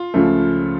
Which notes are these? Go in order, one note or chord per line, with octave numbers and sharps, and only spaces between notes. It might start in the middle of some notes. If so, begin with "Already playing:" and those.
Already playing: F4
C#2 C#3 F3 A3